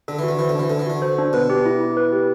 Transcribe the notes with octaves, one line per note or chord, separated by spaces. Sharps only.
D3 A4
E3 F#4
D3
E3 C5
D3
E3 D4
D3 A4
E3
D3 F#4
C5
D4
B2 B4
G4
E4
E4
B4
G4